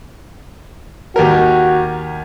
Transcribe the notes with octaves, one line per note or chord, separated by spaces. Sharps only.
D#2 F#4 G4 A#4